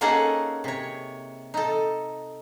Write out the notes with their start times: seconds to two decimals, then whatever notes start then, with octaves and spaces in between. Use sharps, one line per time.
0.01 A#3 C#4 D#4 G#4 A4 F#5
0.64 C3 C#5
1.54 D#4 A4